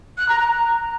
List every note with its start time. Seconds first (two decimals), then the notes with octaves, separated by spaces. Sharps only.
0.18 F#6
0.29 A#5
0.40 A#5